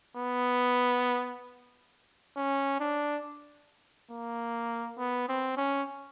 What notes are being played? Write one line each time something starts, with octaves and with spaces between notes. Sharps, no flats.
B3
C#4
D4
A#3
B3
C4
C#4